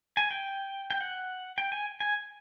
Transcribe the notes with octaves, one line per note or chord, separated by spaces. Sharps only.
G#5
G5
G5
F#5
G5
G#5
G#5